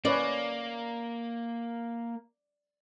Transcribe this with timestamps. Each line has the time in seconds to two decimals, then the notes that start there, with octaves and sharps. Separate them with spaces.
0.05 A#3 C#4 B4 C#5 D5